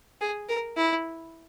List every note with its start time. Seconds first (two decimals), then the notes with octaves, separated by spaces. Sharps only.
0.21 G#4
0.49 A#4
0.77 E4